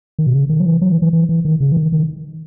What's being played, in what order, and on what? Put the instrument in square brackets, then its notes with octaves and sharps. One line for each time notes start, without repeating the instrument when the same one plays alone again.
[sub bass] D#3
B2
C#3
D#3
F#3
E3
F#3
E3
E3
E3
E3
D#3
C#3
E3
D#3
D#3